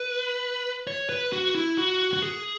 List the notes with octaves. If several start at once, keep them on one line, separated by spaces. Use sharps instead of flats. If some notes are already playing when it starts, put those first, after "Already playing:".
Already playing: B4
C#5
B4
F#4
E4
F#4
F#4
G#4